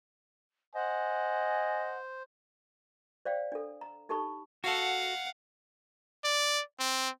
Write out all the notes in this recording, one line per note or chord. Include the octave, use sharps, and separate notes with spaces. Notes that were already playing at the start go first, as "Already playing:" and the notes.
C5 D#5 F#5 G#5
C5 D5 F5 G5
D4 A4
A#5
D#4 G4 A4 A5 B5 C#6
F#4 A4 F5 F#5
D5
C4